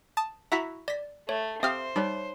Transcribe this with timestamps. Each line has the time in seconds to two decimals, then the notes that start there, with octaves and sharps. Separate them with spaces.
0.17 A5 D#6
0.52 E4 F#4 E5 A#5 B6
0.88 D5 A#6 B6
1.29 A3 C#5
1.63 C4 G4 C5 E5 F5 D#6 F6
1.96 G3 D#4 C#5